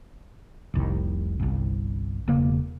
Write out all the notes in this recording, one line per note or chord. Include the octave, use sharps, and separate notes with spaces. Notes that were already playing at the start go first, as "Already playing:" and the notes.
F1 C2 D#3
G1 C2
E1 C#3 A#3 B3